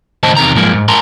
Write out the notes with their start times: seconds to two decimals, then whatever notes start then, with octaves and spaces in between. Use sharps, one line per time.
0.23 C#2 A2 D#3 C5 D#5 A5
0.37 E2 C3 D#3 A#5
0.54 B1 G#2 F3 G#3 A#3
0.73 G#2
0.88 G#2 A#4 A5 A#5 C6